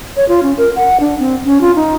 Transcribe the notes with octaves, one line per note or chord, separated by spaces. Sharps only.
C#5
F4
C#4
A#4
F#5
D4
C4
C#4
F4
D#4